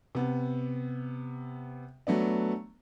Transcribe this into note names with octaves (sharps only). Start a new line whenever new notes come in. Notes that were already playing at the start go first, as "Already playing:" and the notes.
C3 B3
F#3 A3 B3 D4